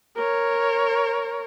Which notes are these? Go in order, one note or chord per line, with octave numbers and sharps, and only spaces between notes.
A#4 C#5